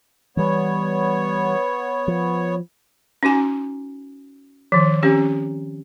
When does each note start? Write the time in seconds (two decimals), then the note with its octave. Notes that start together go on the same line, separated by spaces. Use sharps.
0.37 E3 G3 B3 C#5
2.08 F3
3.23 C#4 D#4 F#4 G#5
4.72 D#3 F3
5.03 C4 C#4 G4